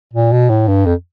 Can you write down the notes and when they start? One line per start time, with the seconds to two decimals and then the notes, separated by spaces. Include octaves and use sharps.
0.14 A#2
0.32 B2
0.50 A2
0.68 G2
0.86 F2